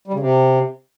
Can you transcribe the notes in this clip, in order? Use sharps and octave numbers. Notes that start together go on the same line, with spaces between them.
G3
C#3
C3